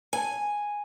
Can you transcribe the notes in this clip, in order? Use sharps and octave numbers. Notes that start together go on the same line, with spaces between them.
G#5